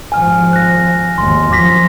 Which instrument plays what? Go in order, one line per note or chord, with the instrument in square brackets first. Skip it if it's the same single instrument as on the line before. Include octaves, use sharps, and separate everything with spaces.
[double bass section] G#1 F3 [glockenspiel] G#5 F6
[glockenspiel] F#6 A#6
[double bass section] G#1 D#2 [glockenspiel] C6
[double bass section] F#2 F3 F#3 [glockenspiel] D6 A#6 B6